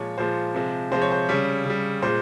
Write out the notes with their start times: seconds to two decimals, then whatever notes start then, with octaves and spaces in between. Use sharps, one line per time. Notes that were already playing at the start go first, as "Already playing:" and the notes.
Already playing: A#2 F3 G#3 C#5
0.18 A#2 F3 G#3 C5
0.54 C3 F3 G#3
0.91 C3 F3 G#3 C5
1.02 C#5
1.12 C5
1.29 C#3 G3 C#5
1.65 C#3 G3
2.02 A#2 G#3 C5